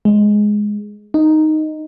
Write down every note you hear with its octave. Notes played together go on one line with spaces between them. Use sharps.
G#3
D#4